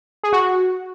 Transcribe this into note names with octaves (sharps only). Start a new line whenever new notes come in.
G#4
F#4